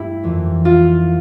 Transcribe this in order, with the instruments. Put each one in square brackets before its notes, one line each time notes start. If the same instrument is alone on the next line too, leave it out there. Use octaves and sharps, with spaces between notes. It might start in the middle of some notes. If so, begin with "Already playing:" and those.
Already playing: [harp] G2 A3 E4 G4
F2 E3 A#3
F4